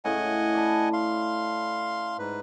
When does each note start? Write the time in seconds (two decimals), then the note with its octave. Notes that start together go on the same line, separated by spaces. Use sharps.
0.05 A2 C#3 D#5 F#5 G#5
0.55 D5 A5 B5
0.93 F5 C6
2.19 G#2 B4